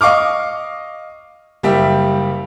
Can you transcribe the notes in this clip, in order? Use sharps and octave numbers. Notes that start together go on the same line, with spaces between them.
D#5 F5 C#6 D6 F6
F#1 G3 G4 E5